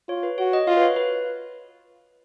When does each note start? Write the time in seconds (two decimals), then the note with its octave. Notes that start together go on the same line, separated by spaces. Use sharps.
0.08 F4 C#5
0.23 B4
0.38 F#4 C#5
0.53 D#5
0.67 F4 F5
0.77 B4
0.82 C#5
0.96 B4